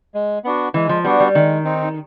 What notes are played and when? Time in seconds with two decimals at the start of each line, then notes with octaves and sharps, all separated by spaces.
0.15 G#3
0.44 B3 D4 F#4
0.74 E3 G#3
0.89 F3
1.04 G3 B3 D4 F#4
1.20 G3
1.34 D#3 G#3
1.64 C4 D#4